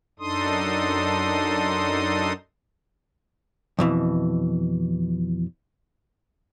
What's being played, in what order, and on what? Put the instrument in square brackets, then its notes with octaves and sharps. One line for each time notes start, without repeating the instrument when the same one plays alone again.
[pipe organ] F#2 D4 D#4 A4 C6 D#6
[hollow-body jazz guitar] F2 B2 E3